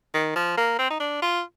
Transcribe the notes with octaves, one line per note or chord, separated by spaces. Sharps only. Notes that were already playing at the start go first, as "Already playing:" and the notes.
D#3
F3
A#3
C4
D#4
D4
F4